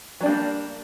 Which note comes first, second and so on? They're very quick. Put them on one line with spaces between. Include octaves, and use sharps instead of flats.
F#3 D4 G3 A#3